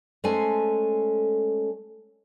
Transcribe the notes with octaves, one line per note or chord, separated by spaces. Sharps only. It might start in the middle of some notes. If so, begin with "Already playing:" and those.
G#3 A3 C#4 A4 C5 G#5